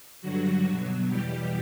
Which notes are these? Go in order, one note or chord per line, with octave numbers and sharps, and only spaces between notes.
G2 D3 F#3 F#4
B2 F#3
E2 B2 G3 G4